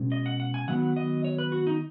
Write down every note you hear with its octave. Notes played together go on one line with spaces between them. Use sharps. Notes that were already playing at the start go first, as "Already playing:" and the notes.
Already playing: B2 G#3 C#4
D#5
F#5
F#5
G#5
D#3 F#3 B3 F#5
D#5
C#5
B4
F#4
D#4